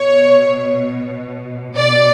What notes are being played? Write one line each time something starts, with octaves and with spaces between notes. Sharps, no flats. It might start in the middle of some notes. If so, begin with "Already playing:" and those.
Already playing: B2 C#5
B2 D5